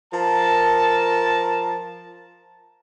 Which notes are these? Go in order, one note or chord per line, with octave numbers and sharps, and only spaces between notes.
F3 A#4 A5